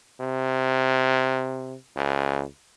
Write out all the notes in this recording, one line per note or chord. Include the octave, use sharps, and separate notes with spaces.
C3
C#2